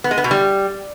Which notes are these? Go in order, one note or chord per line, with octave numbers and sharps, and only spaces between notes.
B3
G#3
B3
B2
G3